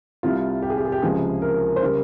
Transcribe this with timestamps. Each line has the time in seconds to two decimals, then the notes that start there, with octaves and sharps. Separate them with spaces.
0.23 C2 C3 G3 F4
0.62 G4
0.70 G#4
0.78 G4
0.85 G#4
0.92 G4
1.02 C#2 C3 F3 G#4
1.42 A#4
1.76 C5
1.81 C#3 G3 A#4